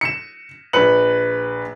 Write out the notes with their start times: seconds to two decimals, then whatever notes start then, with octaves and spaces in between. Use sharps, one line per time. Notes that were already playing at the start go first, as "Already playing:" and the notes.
0.01 C#7 E7
0.73 A#1 B4 C#7 F#7